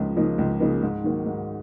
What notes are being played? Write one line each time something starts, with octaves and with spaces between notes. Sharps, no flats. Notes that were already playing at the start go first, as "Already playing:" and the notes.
Already playing: C#2 C#3 F3 A#3 D#4
C#3 F3 A#3 D#4
C#2
C#3 F3 A#3 D#4
G#2
D#3 F#3 A#3
G#2